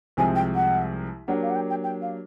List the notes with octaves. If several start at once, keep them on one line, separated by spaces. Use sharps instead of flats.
C2 C3 F3 G#3 C4 G#5
G5
F#5
F#3 A#3 D4 G4 F#5
F5
F#5
G5
G5
G5
F5